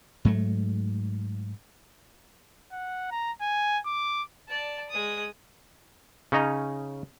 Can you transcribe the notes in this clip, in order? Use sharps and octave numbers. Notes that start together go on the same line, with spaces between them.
G#2 F#3 A3
F#5
A#5
G#5
D6
D5 A5
G#3 D#6
C#3 C#4 D#4 D#5 A#5